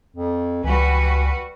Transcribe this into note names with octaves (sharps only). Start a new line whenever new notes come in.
F2
C#2 E3 G3 F#4 B4